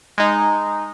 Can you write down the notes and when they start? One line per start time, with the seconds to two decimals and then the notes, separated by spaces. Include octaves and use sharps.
0.18 G#3 D#4